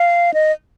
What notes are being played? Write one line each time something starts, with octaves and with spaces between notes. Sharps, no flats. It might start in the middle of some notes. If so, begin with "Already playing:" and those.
Already playing: F5
D#5